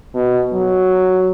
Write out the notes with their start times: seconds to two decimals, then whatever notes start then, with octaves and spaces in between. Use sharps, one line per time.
0.15 B2
0.53 F#3